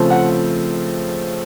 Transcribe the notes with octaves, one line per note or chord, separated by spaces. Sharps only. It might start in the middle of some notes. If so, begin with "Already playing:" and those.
Already playing: C#3 F3 A3 C4
F#5